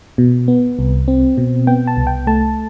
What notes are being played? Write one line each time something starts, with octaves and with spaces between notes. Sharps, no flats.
B2
B3
C2
C4
B2
B3 G5
A5
C2
G5
A3 A5